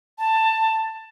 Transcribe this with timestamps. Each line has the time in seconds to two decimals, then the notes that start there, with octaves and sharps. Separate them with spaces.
0.18 A5